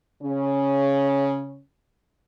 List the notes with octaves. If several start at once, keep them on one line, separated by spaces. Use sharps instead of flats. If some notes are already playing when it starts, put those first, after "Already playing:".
C#3 C#4